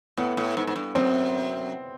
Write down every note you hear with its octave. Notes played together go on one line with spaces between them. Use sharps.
A2 B3
A2
G#2
G#2
G2
F#2 C4